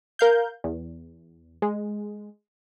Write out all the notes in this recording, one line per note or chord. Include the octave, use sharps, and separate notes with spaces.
A#4 F5 G6
E2
G#3